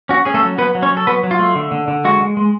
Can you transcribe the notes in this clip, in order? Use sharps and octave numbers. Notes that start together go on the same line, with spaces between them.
C#4 F#4
C#4 G#4
A3 A4
F#3
F#3 B3 B4
F#3
C#4 C#5
F#3
A4
F#3 B3 B4
F#3
F4
A3
D3
D3
D3
G#3 F#4
G#3
G#3